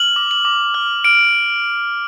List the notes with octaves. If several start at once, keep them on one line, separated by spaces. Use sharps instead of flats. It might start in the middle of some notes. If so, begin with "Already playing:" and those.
Already playing: F6 F#7
D6
F#7
D6
F6
F6 D7